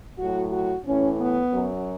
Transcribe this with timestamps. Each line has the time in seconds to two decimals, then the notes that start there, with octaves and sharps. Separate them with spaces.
0.18 A2 F#3 F#4
0.52 F#4
0.86 A2 E3 C#4
1.19 B3
1.53 F#2 F#3